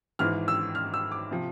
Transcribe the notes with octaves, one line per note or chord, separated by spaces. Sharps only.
G#1 G#2 E3 F6
E6
F6
E6
D6
C3 F3